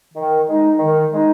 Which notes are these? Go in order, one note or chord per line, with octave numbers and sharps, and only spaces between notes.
D#3
G#3 D#4
D#3
G#3 D#4